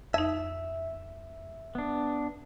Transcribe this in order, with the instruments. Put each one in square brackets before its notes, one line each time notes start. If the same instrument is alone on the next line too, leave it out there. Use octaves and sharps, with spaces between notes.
[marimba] F2 D#4 [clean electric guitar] E5
[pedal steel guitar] B3 D4